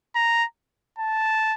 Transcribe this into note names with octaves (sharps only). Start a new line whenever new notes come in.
A#5
A5